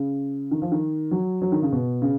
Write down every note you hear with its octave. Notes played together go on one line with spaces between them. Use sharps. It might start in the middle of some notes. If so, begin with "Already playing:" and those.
Already playing: C#3
D#3
F3
D#3
F#3
F#3
D#3
C#3
B2
C#3